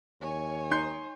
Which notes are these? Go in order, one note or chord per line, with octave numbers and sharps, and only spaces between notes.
D#2 C#5 G#5
D#4 C6 G6 C7